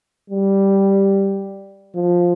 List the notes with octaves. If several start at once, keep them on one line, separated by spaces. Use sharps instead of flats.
G3
F3